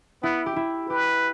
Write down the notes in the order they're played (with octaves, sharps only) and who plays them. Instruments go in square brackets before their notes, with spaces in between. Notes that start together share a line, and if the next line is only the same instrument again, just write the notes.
[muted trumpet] B3 [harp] E4
[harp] G4
E4
[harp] G4 [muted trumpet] B4